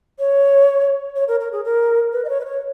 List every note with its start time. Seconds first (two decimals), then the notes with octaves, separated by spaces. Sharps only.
0.19 C#5
1.16 C#5
1.28 A#4
1.40 A#4
1.52 G#4
1.65 A#4
2.13 B4
2.24 D#5
2.29 C#5
2.40 B4
2.45 C#5